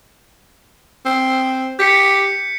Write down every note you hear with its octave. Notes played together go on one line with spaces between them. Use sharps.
C4
G4 G6 B6 C#7